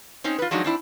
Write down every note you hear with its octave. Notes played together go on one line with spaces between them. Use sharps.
C4 C#4 D#4
F4 B4
F3 F#3 G#3 D4 D#4 F#4
C4 D4 E4